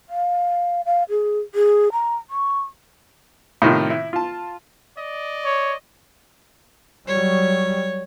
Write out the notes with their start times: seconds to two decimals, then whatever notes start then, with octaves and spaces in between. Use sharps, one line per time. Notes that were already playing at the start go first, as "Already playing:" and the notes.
0.09 F5
0.86 F5
1.10 G#4
1.55 G#4
1.92 A#5
2.30 C#6
3.62 A2 C3 D#3 F4
3.90 E4
4.13 F4 A5
4.97 D5 D#5
5.45 C#5
7.08 F#3 G3 C#5